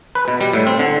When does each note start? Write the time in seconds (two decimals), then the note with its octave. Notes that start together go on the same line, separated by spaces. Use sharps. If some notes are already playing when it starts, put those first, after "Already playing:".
0.15 B4
0.28 B2
0.41 G3
0.53 A2
0.67 C4
0.79 D3